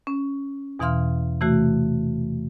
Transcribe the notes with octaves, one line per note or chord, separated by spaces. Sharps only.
C#4
E2 B2 E3 F5 C6 F6
C3 E3 A3 F#4